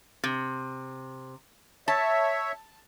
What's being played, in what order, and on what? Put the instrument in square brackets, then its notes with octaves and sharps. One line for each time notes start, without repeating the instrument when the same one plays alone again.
[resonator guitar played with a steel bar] C3
[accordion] C#5 E5 [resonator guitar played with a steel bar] A5